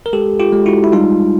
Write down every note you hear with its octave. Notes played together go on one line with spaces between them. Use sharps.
A#4
G#3 G4 A4
F4 G4
G#3
E4 F#4
E4
G3 D#4 F4